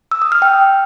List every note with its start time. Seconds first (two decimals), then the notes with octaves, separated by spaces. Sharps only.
0.11 E6
0.22 D#6
0.32 F6
0.42 G5